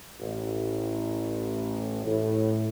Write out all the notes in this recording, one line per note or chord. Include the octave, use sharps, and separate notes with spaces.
A1
A2